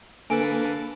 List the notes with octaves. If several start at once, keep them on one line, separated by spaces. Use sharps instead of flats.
D3 A#3 A4 B4 G#5